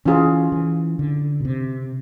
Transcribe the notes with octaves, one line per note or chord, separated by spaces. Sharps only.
E3 C#4 F4 G#4
E3
D3
B2
C3